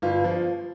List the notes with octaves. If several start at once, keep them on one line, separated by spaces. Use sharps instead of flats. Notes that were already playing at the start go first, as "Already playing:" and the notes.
G1 F4
F3